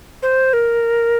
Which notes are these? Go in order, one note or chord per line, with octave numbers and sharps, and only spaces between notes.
C5
A#4